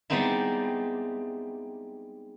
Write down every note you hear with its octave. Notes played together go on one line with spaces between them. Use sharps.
G3 G#3 B3 C4 D#4 E4